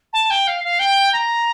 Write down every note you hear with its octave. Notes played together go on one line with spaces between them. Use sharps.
A5
G5
F5
F5
G5
A#5